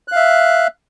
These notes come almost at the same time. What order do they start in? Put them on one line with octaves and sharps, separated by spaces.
F#6 F5 E5